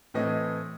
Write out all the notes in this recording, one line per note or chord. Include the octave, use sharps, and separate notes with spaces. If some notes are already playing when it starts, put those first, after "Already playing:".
A2 E3 A3 C4 D#5